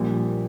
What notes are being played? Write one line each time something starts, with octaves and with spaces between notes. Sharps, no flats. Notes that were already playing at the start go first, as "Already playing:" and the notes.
Already playing: A#1 A#2 G3